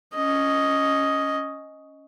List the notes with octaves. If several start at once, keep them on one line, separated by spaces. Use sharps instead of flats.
C#4 D#5